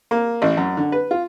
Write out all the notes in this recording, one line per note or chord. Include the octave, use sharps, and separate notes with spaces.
A#3
A1
F#2
D3
B4
F4